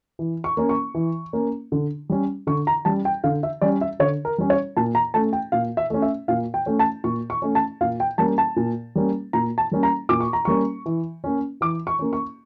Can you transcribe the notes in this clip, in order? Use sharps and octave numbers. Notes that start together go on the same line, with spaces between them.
E3
C#6
A#3 C#4
C#6
E3
A#3 C#4
D3
G3 C#4
D3 C#6
A#5
G3 C#4 A5
G5
D3 F5
E5
G3 C#4 D5
E5
D3 C#5
A#4
G3 C#4
C#5
A#2 A5
A#5
A3 C#4 A5
G5
A#2 F5
E5
A3 C#4
E5
A#2 F5
G5
A3 C#4
A5
A#2 C#6
C#6
A3 C#4
A5
A#2 F5
G5
G3 A#3 C#4 A5
A5
A#2
G3 A#3 C#4
A#2 A#5
A5
G3 A#3 C#4
A#5
A#2 D6
C#6
A#5
G3 A#3 C#4 C#6
E3
A#3 C#4
E3 D6
C#6
A#3 C#4
C#6